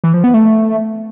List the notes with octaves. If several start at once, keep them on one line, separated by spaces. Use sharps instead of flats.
E3
F3
B3
A3